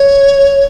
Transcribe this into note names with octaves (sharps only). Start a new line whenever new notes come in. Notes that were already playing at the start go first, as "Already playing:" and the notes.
Already playing: C#5